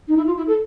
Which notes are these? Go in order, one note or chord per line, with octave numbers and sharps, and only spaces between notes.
D#4
E4
F4
E4
A4